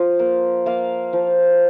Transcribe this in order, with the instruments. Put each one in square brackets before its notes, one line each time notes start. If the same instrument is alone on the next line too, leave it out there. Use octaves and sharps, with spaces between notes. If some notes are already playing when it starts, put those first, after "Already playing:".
Already playing: [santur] F3 F4
A#3
A#3 F5
F3